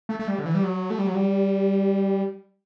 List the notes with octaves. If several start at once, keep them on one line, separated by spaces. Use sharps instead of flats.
A3
A3
G3
D3
E3
G3
F#3
A3
G3
F#3
G3